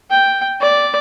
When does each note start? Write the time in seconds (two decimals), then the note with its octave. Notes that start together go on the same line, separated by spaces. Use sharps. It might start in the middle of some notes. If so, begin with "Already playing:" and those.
0.11 G5
0.61 D5